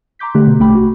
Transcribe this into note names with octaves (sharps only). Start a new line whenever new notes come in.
A#5 C6 D6 G6 B6
D3 A3 G4 F#6
B2
A#1 A3 G5 B5 D6
F#4